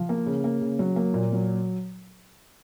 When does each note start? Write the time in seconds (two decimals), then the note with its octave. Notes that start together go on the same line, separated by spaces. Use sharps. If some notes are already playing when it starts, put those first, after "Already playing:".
Already playing: F3
0.09 A#3
0.26 C#3
0.44 A#3
0.61 C#3
0.79 F#3
0.96 A#3
1.14 A#2
1.33 F#3